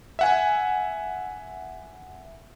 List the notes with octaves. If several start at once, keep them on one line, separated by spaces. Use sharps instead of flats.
E5 F#5 G#5